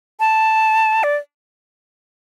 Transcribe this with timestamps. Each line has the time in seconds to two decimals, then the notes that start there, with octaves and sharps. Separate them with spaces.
0.20 A5
1.03 D5